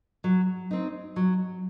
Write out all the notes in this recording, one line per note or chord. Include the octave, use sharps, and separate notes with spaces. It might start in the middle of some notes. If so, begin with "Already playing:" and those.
F#3
C4 D#4
F#3